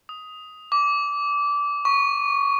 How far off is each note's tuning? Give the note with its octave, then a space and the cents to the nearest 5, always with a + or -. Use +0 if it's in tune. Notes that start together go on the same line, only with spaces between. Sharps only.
D#6 +10
D6 -20
C#6 +10